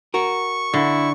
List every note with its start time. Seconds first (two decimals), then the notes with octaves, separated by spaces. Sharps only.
0.14 F#4 A#4 C#6
0.74 D3 E4